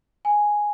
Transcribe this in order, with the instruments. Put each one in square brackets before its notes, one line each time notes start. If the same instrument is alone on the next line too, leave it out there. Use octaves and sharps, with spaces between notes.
[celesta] G#5